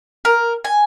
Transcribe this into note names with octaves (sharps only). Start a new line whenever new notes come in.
A#4
G#5